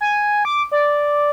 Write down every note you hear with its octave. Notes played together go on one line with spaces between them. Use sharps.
G#5
D6
D5